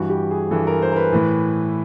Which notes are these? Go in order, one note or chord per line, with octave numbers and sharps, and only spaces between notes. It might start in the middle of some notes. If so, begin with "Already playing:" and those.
Already playing: G2 E3 F#4
G4
G#4
G2 E3 A4
A#4
C5
A#4
B4
A2 E3